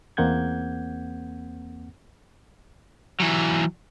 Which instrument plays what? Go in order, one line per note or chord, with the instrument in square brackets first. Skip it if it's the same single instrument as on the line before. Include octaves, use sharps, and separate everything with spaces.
[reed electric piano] E2 A#3 C4 F#5 G6 G#6
[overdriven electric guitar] E3 F#3